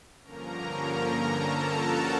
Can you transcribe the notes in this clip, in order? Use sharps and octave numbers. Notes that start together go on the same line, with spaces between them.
G2 D3 F3 A#3 C#4 A#4 A#5
A4 A5
F#4 F#5